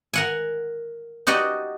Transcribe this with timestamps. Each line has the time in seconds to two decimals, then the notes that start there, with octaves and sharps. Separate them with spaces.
0.14 A#4 F#5 G#5
1.27 D#4 F#4 G4 D5 D#5